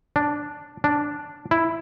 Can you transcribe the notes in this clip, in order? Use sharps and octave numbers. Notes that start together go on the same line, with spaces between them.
D4
D4
E4